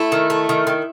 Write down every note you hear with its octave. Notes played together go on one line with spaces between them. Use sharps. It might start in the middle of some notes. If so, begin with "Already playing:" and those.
Already playing: A3 E4
D#3
A3
D#3
D#3